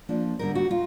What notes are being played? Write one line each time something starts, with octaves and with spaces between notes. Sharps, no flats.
F3 A#3 D4
D3 G3 B3 D#4 A#4
F#4
D#4 F4